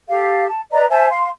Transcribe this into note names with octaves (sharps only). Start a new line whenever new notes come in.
G4 A4 F5
A5
B4 D5 D#5 A#5
C5 E5 G#5 A5
F5 C6